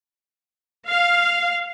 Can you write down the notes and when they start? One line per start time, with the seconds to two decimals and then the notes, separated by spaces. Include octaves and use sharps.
0.88 F5